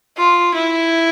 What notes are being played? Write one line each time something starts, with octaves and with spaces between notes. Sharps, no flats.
F4
E4